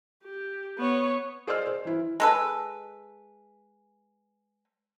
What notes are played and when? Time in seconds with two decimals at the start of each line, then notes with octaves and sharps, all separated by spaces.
0.23 G4
0.78 B3 C#5
1.47 G#4 C5 D5 D#5 E6 F6
1.67 C5
1.85 E3 E4
2.20 G#3 A4 B4